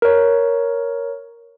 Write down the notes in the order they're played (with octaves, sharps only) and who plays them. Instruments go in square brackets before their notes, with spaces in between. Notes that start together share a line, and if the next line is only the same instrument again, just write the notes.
[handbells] A#4 C#5